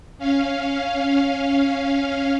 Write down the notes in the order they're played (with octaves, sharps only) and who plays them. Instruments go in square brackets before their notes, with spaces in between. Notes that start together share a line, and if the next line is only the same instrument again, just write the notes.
[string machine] C#4 F5